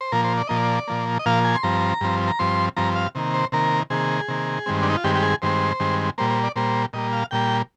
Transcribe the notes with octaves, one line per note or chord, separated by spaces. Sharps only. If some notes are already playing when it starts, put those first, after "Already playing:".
C5
A#2 F3 A#3 A#4
C5
D5
A#2 F3 A#3 D#5
D5
A#2 F3 A#3
D#5
A#2 F3 A#3 F5
G#5
C6
G2 F3 C4 A#5
G2 F3 C4
A#5
G2 F3 C4 C6
G2 F3 C4 A#5
F5
C3 D#3 A#3
C5
C3 D#3 A#3 A#4
C3 D#3 A#3 G#4
C3 D#3 A#3
G2 D#3 G#3 C4
D4
D#4
F4
G2 D#3 G#3 C4 G4
G4
G#4
G2 D#3 G#3 C4 C5
G2 D#3 G#3 C4
A#2 G3 A#3 C5
C5
D5
A#2 G3 A#3 C5
A#2 G3 A#3 D#5
F5
A#2 G3 A#3 G5